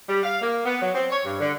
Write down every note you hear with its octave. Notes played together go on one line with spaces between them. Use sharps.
G3
F5
A#3
B3
F#3
C4
C#5
G2
D3